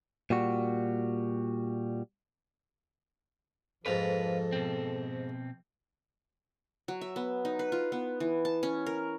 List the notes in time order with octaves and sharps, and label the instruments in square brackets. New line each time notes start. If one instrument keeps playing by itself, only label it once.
[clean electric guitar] A#2 G3 F#4
[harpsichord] F2 G#2 [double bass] F3 [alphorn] A4 [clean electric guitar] B4 F5
[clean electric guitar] B2 C4
[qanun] F#3
E5
B3
D#4
B4
F4
B3
E3
A5
C#4
A#4